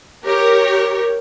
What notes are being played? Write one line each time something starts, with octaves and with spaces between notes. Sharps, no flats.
G4 A#4 C#5